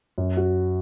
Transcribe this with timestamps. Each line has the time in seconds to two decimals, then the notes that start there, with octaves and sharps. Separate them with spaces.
0.18 F#2
0.37 F#4